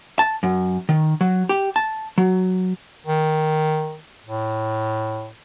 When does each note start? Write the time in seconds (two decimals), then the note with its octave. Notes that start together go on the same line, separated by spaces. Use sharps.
0.19 A5
0.43 F#2
0.89 D#3
1.21 F#3
1.49 G4
1.76 A5
2.18 F#3
3.06 D#3
4.26 A2